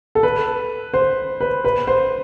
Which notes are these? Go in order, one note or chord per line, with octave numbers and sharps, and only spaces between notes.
A4
B4
C5
B4
B4
C5